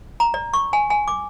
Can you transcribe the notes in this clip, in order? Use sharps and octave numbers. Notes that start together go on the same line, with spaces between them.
A#5
D5
C#6
G#5
G#5
D6